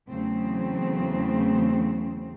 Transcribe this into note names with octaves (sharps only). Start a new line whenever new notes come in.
E2 C#3 F#3 A3 C4